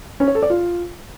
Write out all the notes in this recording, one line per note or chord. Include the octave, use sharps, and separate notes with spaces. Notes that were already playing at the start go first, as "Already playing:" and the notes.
C#4
C#5
A4
D5
F4